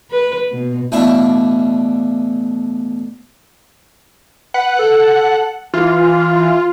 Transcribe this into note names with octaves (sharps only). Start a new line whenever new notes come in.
B4
B2
A1 B2 D4 E4 E5 F5
B4 F#5
A4
E3 F4